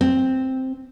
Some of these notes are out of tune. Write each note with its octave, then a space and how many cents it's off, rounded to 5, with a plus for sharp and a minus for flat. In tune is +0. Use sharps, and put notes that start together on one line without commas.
C4 +0